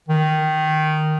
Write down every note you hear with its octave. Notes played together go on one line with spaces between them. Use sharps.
D#3